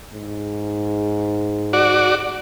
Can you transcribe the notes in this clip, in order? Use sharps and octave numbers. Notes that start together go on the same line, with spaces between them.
G#2
F#4 D5